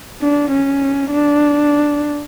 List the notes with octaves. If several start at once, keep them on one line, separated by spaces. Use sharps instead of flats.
D4
C#4
D4